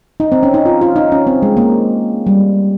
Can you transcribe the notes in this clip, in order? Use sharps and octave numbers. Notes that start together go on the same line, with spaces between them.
D#4
C4
C#4
D#4
F4
F4
D#4
C#4
C4
G#3
A#3
G3